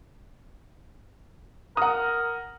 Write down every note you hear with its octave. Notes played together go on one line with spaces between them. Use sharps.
A#4 F#5 D#6